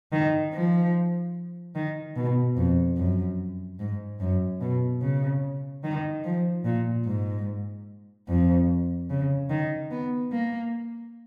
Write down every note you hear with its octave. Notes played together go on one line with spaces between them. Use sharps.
D#3
F3
D#3
B2
F2
F#2
G#2
F#2
B2
C#3
D#3
F3
A#2
G#2
F2
C#3
D#3
B3
A#3